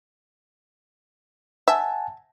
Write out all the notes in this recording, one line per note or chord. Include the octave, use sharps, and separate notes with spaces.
E5 F#5 G#5 A5